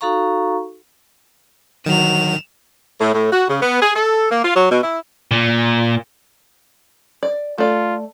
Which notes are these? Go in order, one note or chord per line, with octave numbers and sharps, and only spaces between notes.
D#4 F#4 A4 F5 A#5 C#6
D#3 F#3 E7 F7
A2
A2
F#4
C#3
B3
G#4
A4
A#3
F4
F#3
B2
E4
A#2
D5
A3 F4 D5